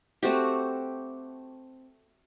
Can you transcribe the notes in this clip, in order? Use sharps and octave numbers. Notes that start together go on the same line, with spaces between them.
A3 C4 F#4 G4